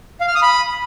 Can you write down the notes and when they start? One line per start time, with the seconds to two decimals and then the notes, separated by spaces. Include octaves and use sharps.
0.21 F5
0.28 F6
0.35 D#6
0.42 B5